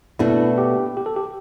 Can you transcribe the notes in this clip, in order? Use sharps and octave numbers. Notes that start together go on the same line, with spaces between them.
B2 A3 D4 E4 F#4
G4
G4
A4
G4